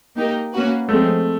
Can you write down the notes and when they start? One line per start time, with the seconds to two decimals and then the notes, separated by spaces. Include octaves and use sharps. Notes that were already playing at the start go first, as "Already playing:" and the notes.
0.17 A#3 D#4 G4 A#4
0.53 A#3 C#4 F#4 B4
0.88 F3 G#3 A3 C4